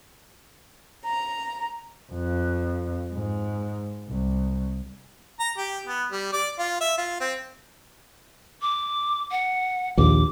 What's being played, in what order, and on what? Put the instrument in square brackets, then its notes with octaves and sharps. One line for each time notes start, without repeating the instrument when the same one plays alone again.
[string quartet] A#5
[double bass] F2
G#2
C2
[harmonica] A#5
G4
B3
G3
D5
F4
E5
F4
C4
[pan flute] D6
F#5
[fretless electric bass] A#1 D#2 [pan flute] D6